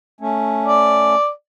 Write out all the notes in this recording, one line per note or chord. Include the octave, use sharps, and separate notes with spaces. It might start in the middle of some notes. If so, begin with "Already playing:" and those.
A3 C#4
D5